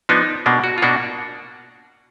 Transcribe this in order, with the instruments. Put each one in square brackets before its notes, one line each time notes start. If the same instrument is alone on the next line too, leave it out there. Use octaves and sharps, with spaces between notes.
[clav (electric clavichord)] F3 B3 D4 D#4
B2 A#3 D4
F#4
F4
B2 A#3 D4 F#4